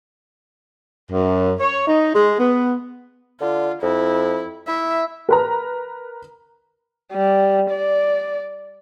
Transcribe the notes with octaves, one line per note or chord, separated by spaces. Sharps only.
F#2
C#5
D#4
G#3
B3
D3 F4
F2 E4
E4 E5
A#4 B4 A#5
G3
D5